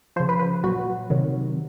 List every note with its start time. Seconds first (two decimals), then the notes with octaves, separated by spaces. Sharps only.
0.16 F3 C5
0.20 C#3
0.29 B4
0.39 B4
0.64 A#2 F#3 F#4
1.10 C3 D#3 F#3